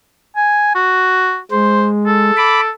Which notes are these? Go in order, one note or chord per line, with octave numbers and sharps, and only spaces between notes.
G#5
F#4
G#3 C5
A4
B5 D6